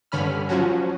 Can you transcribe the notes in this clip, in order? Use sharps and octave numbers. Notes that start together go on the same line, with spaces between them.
G2 D3 C#4 B5 F6
F3 F#3 C#4 F#4